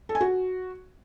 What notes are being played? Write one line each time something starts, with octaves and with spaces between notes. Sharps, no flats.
A4
G#5
F#4